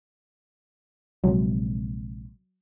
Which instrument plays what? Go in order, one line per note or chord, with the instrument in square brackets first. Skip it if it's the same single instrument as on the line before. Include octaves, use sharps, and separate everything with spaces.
[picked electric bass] A#1 C3 G#3 [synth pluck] F#3